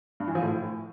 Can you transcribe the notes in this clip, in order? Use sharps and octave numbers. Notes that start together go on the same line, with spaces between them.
G2
E3
F3
A2